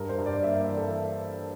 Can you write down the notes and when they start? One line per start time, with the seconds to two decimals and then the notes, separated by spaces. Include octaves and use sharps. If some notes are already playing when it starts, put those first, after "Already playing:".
Already playing: G2 A#4
0.09 C5
0.18 G2
0.26 D5
0.44 A#3 E5
0.61 D5
0.69 E3
0.77 A4